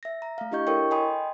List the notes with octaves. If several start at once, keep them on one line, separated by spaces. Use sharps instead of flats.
E5 A#6
A#5
A3 F5
D4 E4 G4 D#5 C#6 G6
E4 A4 A#4 C#5 G5 C#6
D#5 G5 G#5 B5 C6 D#6